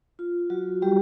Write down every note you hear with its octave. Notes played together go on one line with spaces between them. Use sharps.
F4
F#3 F#4
G3 G4